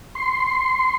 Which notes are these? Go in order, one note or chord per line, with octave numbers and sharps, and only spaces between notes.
C6